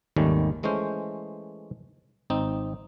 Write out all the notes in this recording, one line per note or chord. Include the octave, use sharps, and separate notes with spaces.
G#1 D#2 D#3 G3 A3 C#4
E3 G#3 A3 C#4 C5
G#1 C4 D#4